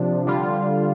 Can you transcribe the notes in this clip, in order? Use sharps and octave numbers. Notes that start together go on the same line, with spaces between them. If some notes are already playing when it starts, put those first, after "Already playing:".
Already playing: C3 F3 D4
D3 G3 F4